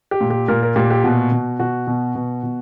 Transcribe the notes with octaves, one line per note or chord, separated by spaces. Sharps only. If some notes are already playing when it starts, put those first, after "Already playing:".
G4
A#2
G4
A#2 A#4
A#4
A#2 G4
G4
B2 F#4
B2
B2 F#4
B2
B2
B2